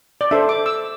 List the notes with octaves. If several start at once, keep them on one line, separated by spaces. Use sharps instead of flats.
D5
D4 A4 C5 E5
D6
E6